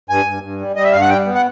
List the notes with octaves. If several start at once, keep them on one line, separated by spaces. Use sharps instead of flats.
G2 G#5
G2
G2
G3
G3 D#5
E5
G2 F5
F#5
G3 G5
B3
F#5